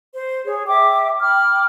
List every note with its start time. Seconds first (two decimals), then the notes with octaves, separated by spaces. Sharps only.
0.14 C5
0.45 G#4 C#5
0.68 E5 G5 D6
1.20 G5 B5 D6 F6